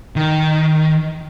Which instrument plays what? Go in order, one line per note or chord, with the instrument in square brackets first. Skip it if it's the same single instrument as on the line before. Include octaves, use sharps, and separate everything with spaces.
[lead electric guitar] D#3